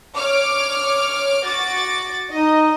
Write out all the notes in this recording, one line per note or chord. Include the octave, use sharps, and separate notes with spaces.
C#5 D6 F6
F#4 D6 A6
D#4 D#5